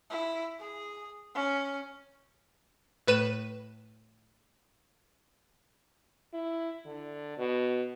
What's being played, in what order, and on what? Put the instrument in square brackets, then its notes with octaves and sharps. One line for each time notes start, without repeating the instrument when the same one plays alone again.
[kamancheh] E4
G#4
C#4
[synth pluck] A2 B4 D#7 E7
[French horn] E4
D3
B2